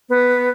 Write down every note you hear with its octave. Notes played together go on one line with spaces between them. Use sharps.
B3